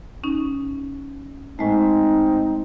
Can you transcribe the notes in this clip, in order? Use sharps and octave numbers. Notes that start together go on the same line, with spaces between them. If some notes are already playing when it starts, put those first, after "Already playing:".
C#4 D#4
A2 G#3 A3 C4 D#4